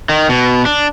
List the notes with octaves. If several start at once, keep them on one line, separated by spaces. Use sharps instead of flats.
D#3
B2
D4